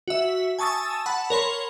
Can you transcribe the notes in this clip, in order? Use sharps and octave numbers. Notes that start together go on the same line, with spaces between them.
F#4 E5
G#5 A5 C#6 D#6 E6 A6
F#5 A5 B5
A#4 C#5 B5 C6